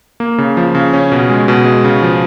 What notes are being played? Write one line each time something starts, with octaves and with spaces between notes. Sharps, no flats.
A#3
C#3
F3
C#3
C#4
B2
G#3
B2
G#3
C#3
F3